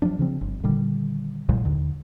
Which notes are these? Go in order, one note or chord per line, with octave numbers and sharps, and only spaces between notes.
F3 F#3 A#3 D4
C#3 F3 C4
G1
A#2 D3 D#3 G3
C2 A#2 F#3 G#3
D#2 D3